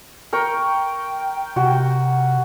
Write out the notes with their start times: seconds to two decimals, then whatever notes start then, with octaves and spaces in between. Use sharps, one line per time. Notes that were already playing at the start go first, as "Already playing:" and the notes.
0.33 A#4 G5 C#6
1.56 C3 F#4